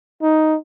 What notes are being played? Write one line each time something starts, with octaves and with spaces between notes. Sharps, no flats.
D#4